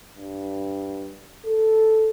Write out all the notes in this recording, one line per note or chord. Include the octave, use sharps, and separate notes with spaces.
G2
A4